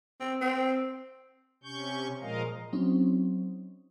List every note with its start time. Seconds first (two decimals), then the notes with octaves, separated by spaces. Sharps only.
0.20 C4
0.41 C4
1.63 C3 C#4 C#6 G6
2.21 A#2 F3 G#3 A#4 D#5 F5
2.73 F#3 C4 C#4 D#4